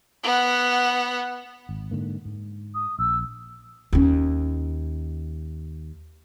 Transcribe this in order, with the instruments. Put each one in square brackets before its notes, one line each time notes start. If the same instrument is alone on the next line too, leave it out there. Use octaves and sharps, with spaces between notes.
[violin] B3 F#5
[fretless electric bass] G#1
G#2 D3 A#3
G#2
[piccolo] D#6
[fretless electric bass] A#1 [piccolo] E6
[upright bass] D#2 C#4